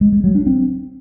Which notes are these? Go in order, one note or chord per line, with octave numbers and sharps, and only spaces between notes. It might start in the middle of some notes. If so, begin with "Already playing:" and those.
G#3
G#3
F#3
D4
C4